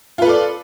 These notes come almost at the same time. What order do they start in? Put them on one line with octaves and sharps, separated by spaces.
F4 B4 A4 D5